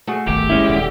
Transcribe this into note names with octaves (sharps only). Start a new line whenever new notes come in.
A3 F#4 G#4
D1 G1 D#3 G4
G#3 C#4 E4
D#1 D3